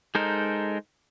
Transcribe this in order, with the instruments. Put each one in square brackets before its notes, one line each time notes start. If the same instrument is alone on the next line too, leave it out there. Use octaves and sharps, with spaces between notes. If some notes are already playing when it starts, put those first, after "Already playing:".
[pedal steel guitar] G#3 D#4 A4 A#4 C5